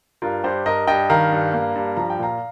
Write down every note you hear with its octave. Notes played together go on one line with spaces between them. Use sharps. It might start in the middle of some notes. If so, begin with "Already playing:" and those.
G2 F4 A#4
G2 G4 C5
G2 A#4 D#5
G2 D#5 G5
D#3 F5 A#5
G2
A#3
G2
F3 A#5
G5
A#2 F5 A#5